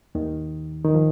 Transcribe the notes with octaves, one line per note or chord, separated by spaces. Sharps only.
D#2 D#3
D#3
F3